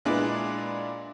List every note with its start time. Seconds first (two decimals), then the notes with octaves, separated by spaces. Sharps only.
0.05 A#2 G#3 D4 E4 B4 D5